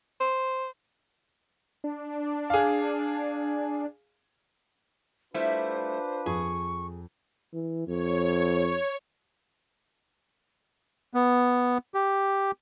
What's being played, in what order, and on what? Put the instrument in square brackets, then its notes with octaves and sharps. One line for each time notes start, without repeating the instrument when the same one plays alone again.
[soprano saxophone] C5
[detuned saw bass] D4
[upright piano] G#4 F5
[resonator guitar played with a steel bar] G3 A3 E4 [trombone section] D4 F4 B4 [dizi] C5
[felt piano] F2 [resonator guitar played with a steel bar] G#4 [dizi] C#6
[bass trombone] E3
[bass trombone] F2 [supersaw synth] C#5
[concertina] B3
G4